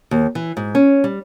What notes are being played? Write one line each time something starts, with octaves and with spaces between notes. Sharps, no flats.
D#2
E3
G#2
C#4
G3